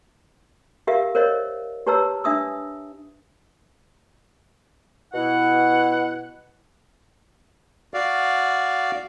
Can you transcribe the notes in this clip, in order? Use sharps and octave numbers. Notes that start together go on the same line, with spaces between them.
G4 A#4 E5 F5
A#4 C5 C#5 D#5
G4 B4 C#5 A5 A#5 E6
D4 E5 D#6 E6
B2 E4 F#5
F#4 D5 F5